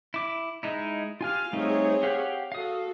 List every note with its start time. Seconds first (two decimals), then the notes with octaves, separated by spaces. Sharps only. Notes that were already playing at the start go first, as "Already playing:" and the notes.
0.14 E4 D6
0.63 G#3 D#4 E4
1.21 F4 G4 F5 G#5 F6
1.53 G3 A3 C4 D#4 G#4 C#5
2.03 G4 F5 F#5
2.52 F#4 A4 F5 D#6